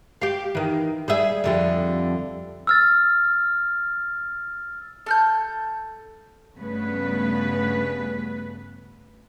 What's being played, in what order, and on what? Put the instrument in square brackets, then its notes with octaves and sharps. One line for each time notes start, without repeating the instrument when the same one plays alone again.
[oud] G4 F5
D#3 E3
G3 G#4 E5
F2 D3 G3
[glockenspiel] E6 F6 A6
[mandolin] A4 F6 G6
[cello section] G2 C#3 A3 B3 B4